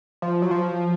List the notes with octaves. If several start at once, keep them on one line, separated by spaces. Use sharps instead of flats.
F3
F#3
F3